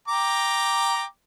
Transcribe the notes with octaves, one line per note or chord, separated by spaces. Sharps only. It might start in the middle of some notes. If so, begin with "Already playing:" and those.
G5 A#5 D6